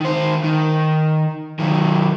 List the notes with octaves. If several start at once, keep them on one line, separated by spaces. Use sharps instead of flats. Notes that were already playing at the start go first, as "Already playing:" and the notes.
D#3 C5
D#3
D#3 F#3